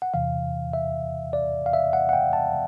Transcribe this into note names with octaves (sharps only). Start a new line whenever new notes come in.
F#5
E2 C3 E3 F5
E5
D5
F5
E5
F#5
F#5
G5
A5